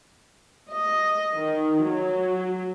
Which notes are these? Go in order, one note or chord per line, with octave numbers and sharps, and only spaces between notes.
D#5
D#3
F#3